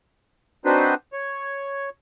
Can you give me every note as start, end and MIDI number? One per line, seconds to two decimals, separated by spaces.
0.65 0.94 60
0.65 0.94 62
0.65 0.94 63
0.65 0.94 66
0.65 0.94 71
0.65 0.94 72
1.13 1.90 73